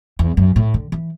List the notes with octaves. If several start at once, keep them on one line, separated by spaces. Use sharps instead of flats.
E2
F#2
A2
D3
E3